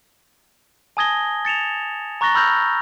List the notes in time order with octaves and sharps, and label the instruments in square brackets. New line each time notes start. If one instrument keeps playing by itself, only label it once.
[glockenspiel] G#5 A5 D#6 G#6 A#6 G7
A6 C#7 E7 F7
A#5 C#6 F#6 A6 A#6 G7
B5 E6 F6 G6 A#6 F7